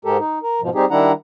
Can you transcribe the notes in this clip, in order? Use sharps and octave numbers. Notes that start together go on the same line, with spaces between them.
G#2 G#3 G4 A4 A#4
D#4
A#4
G#2 B2 F3
G3 C4 D#4 G4 G#4
D#3 G3 D4 E4 F#5 A#5